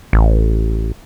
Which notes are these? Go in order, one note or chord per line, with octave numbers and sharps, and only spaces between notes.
A1